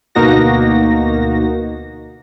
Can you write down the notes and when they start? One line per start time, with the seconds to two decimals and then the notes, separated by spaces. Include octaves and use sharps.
0.15 D2 B2 A#3 D#4 F#4 A#6